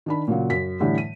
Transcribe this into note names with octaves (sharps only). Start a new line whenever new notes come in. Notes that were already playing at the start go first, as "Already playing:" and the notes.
D#3 D4 B5
A#2 C#3 F#3
F#2 B6
A2 D3 E3 G3
D#7